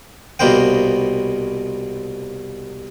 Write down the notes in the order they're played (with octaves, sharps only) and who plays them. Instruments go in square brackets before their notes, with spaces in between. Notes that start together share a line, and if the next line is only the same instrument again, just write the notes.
[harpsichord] C2 B2 A#3 B3 C5 G5